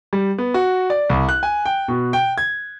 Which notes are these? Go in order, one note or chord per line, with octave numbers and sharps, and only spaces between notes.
G3
B3
F#4
D5
C2
F#6
G#5
G5
B2
G5
G#6